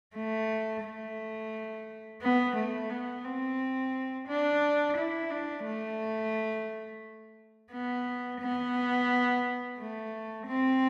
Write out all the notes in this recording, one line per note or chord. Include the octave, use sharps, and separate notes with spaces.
A3
A3
B3
A3
B3
C4
D4
E4
D4
A3
B3
B3
A3
C4